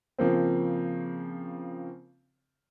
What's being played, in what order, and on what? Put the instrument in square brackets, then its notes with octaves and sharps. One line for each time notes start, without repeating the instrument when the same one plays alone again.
[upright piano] C#3 F3 A#3 C4